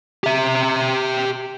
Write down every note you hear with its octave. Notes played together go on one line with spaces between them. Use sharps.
G4 E5